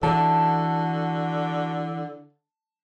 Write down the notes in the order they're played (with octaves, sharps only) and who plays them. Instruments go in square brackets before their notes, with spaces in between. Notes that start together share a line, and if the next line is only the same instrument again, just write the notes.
[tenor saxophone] D3 [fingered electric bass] E3 [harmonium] F#4 A4 [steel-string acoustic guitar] A5